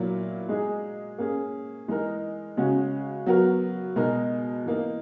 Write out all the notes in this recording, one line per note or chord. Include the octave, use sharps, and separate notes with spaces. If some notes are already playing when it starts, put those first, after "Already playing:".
Already playing: A#2 F#3 A#3 E4
G#3 D#4 G#4
A#3 C#4 G#4
E3 G#3 D#4 A#4
C#3 G#3 C#4 F#4
F#3 B3 F#4 A#4
B2 G#3 D#4 A#4
E3 A#3 D#4